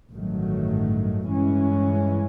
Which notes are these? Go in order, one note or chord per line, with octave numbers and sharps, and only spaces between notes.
A1 G2 D#3 F#3 A3
G2 E3 G#3 C#4